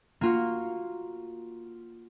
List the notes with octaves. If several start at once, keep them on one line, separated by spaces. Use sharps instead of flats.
A#3 F4 F#4